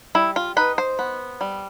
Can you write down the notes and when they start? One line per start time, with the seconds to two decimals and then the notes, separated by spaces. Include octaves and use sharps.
0.15 G3 E4
0.36 F4
0.57 D#4 B4
0.78 C5
0.99 B3
1.41 G3